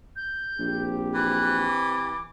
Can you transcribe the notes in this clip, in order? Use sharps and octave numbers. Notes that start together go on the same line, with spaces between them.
G6
A#1 C4 G4
E3 F#6
D6